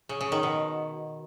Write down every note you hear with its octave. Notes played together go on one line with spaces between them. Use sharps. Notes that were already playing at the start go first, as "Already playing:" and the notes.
C#3
C#3
D#3
B2